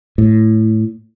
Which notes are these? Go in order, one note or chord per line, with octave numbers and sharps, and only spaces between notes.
A2